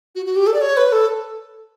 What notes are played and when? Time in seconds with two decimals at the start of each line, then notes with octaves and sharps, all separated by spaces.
0.16 F#4
0.26 F#4
0.36 G4
0.47 A4
0.54 D5
0.61 C#5
0.77 B4
0.92 A4